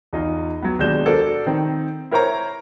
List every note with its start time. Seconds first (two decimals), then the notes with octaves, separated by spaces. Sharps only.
0.13 E2 D#4 F4
0.62 F#3 B3
0.79 D#2 B2 G#3 D4 G6 E7
1.05 D4 F#4 A4 A#4 C5 D5
1.46 D#3 C4
2.11 E4 A#4 C5 C#5 A#5